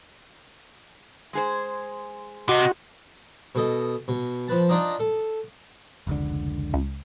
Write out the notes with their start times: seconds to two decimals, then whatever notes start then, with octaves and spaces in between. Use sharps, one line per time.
1.33 G#3 G#4 C5
2.49 C3 F#4 D#5
3.55 B2 A4 D#5
4.08 B2
4.48 F3 B4 A5
4.69 D4 D#4 F4 D5 D#5 A#5
5.00 A4
6.07 F1 C#2 D3
6.74 C#2